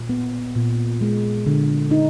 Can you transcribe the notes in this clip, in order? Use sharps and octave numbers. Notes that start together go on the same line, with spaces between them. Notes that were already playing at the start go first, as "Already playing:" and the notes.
Already playing: A#2
B3
A#2
G#3
D3
D#4